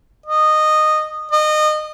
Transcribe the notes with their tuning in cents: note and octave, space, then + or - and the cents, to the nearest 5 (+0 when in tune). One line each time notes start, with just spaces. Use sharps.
D#5 -15
D#5 -25